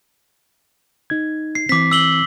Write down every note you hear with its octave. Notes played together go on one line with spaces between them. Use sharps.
D#4 G#6
C7
E3 C4 D6 B6
E6 F#7 G7